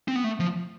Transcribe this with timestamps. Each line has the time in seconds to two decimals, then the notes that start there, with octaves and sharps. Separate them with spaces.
0.08 C4
0.16 B3
0.24 A3
0.40 F3